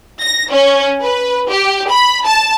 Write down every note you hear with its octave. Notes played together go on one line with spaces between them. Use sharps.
A#6
C#4
B4
G4
B5
A5